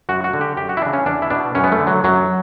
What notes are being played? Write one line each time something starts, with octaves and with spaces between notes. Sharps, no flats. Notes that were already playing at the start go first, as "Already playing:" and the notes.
F#2 F#4
F#4
D3
G4
F#2 G4
F#4
E4
C#3 E3 D4
C#4
E2 D4
E4
B2 D4
F#2 C#4
B3
A3
D3
F#3
F#2 F#3